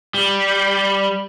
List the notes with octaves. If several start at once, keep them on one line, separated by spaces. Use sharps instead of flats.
G3